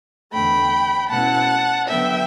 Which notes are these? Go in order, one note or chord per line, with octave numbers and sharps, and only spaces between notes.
E2 D3 A3 G5 B5
B2 A3 C#4 E4 F#5 A5
D3 F#3 B3 E5 G5